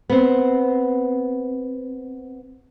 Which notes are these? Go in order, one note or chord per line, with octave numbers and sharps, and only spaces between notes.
B3 C4